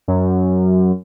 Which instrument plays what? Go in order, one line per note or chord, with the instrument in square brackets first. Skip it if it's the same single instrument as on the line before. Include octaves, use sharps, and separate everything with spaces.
[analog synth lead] F#2